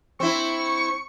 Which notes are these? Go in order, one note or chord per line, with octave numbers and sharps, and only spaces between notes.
C4 E4 C#6